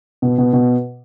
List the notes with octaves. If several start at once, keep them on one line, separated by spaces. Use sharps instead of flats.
B2
B2
B2